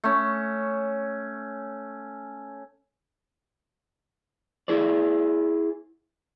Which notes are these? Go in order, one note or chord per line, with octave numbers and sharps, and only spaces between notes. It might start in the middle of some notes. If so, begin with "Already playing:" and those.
A3 C#4
E4 G#4 C5 D5